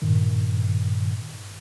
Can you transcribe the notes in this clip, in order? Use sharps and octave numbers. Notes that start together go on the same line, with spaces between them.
G2 A#2 D#3